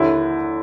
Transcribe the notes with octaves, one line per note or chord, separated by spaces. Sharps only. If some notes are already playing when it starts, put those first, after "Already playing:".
Already playing: D#2 D3 E4